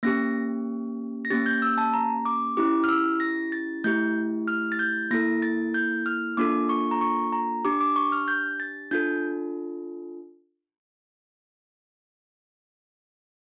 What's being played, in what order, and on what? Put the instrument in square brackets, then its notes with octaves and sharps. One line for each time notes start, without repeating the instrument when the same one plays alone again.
[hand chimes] A#3 C#4 G4 A#6
A#6
A#3 C#4 G4 A6
G6
E6
A5
A#5
D6
C#4 E4 G4 D6
F6
E6
A#6
A6
A3 E4 G4 G6
F6
A6
G6
A#3 E4 A4 A#6
A6
G6
F6
A#3 D4 F4 A4 D6
C#6
A#5
C#6
A#5
D4 G4 D6
D6
C#6
F6
G6
A6
D4 F4 A4 G6